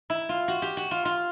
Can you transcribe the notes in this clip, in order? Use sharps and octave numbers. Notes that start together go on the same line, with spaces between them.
E4
F4
F#4
G4
F#4
F4
F4